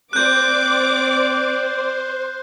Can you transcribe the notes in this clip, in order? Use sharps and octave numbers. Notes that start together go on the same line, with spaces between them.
C4 C5 D5 D6 F#6 G6